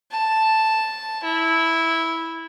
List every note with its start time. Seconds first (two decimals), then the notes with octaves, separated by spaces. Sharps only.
0.11 A5
1.24 E4